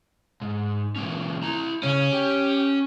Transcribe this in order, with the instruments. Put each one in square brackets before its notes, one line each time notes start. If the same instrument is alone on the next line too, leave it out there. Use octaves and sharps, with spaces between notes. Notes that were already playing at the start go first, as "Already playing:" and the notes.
[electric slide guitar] G#2
E3 A#3 C#4
E4 A#5
[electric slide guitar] C#3 [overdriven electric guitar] C#4
[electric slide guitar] G4